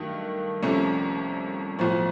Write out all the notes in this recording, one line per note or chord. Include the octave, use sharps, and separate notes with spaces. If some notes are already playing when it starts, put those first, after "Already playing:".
Already playing: G2 D#3 F#3 A3
C2 C3 F3 A3 C#4
B1 A2 F3